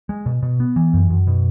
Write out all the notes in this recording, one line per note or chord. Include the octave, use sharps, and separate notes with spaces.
G#3
B2
B2
B3
E3
F#2
F#2
B2